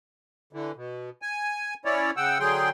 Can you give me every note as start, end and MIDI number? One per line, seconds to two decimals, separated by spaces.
0.53 0.72 50
0.53 0.72 52
0.76 1.10 47
1.22 1.74 80
1.85 2.11 61
1.85 2.11 64
1.85 2.11 73
1.85 2.11 74
2.17 2.38 49
2.17 2.38 78
2.17 2.38 79
2.17 2.38 88
2.40 2.69 50
2.40 2.69 54
2.40 2.69 68
2.40 2.69 79
2.40 2.69 84